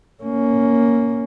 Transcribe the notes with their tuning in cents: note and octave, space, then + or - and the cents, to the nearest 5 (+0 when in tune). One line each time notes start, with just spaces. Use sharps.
A#3 +0 C#4 +10